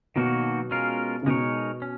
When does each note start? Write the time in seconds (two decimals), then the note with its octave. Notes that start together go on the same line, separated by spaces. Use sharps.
0.16 B2 D#3 F#3 A#3 D#4 F#4
0.71 G#3 C#4 F4 A#4 F5
1.22 C#3
1.26 B2 G#3 D#4 A#4 C#5
1.82 C#4